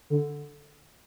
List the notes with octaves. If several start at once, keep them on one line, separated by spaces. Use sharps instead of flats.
D3